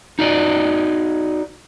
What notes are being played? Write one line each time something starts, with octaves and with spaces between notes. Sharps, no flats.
D#4 F#4 D5 D#5